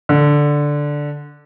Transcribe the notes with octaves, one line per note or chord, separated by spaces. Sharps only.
D3